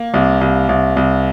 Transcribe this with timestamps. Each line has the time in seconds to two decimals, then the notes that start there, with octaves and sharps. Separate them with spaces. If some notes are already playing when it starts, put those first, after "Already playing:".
Already playing: A#3
0.14 C2
0.41 C2
0.69 C2
0.96 C2